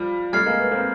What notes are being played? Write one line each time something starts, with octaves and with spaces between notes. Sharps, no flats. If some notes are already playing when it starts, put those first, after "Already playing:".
Already playing: F3 G3
G3 A3 F6 G#6 C7
G#3 A#3
A3 B3
A#3 C4